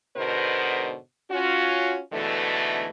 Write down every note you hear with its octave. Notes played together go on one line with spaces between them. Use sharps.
G#2 B2 D3 B3 A#4 C5
C#4 F4 F#4
G#2 B2 D3 E3 A3